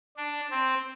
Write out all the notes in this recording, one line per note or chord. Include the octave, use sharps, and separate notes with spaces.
D4
C4